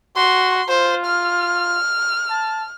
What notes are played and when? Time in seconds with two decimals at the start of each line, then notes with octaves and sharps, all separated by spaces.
0.17 F#4 C6
0.69 F4 C5
1.06 F6
2.30 A5